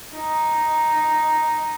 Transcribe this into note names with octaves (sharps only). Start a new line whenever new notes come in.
D#4